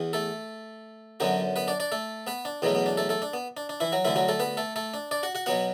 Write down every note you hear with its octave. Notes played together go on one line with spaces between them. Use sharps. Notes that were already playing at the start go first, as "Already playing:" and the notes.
Already playing: E2 E3
A3 A4
F#2 D3 F#3 B3 F#4
B3 B4
D4 D5
D4 D5
A3 A4
B3 B4
D4
E2 B2 F#3 A3 B3
B3
D4
A3 A4
A3 A4
D4
B3
D4
D4
E3 E4
F#3 F#4
D2 D3 E3 A3 E4
F#3 F#4
A3 A4
B3 B4
A3 A4
A3 A4
D4
D4 D5
F#4 F#5
F#4 F#5
B2 F#3 B3 F#4 F#5